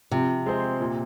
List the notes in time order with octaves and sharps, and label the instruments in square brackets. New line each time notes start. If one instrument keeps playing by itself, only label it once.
[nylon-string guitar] C3 [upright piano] F3
[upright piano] G#3 C4 G#4 C5
A#2